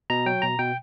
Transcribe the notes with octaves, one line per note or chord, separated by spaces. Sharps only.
B2 A#5
F#3 G5
B2 A#5
B2 G5